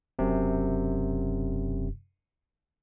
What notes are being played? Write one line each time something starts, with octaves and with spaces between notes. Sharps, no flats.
E1 F#2 C3